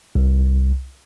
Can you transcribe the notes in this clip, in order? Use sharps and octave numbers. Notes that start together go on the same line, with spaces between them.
C2